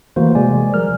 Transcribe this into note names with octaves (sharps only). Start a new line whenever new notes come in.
E3 A3 A#3 F#4 C5
C3 G#3 G#4 D5 G#5
F3 G3 A#4 F6